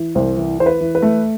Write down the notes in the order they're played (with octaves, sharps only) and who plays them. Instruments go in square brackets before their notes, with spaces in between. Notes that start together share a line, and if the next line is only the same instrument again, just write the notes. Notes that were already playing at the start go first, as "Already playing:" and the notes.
Already playing: [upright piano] E3
C2 C5
E3
E3 C5
B4
E3
B4
A3